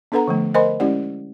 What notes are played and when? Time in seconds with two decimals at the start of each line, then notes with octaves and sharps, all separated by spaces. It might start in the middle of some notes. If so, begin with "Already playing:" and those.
0.12 B3 D4 A4 B4 F#5 A#5
0.27 D3 F3 A3
0.54 A#4 C5 D#5 G#5 B5 C6
0.80 G#3 C#4 E4 G4 D5 F#5